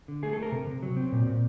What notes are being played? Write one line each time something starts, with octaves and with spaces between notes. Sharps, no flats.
D3
A3 G#4
A4
A3
A#4
C3
C3
F#3
C4
A#2
A#2